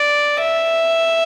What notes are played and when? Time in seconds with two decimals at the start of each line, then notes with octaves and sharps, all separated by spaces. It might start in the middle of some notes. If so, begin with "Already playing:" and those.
Already playing: D5
0.41 E5